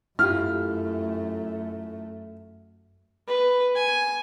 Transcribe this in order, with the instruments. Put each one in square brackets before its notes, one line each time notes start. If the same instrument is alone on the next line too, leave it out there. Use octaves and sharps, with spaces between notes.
[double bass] F#2 A3 [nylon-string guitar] E4 F4 G4 [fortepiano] F6
[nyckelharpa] B4
G#5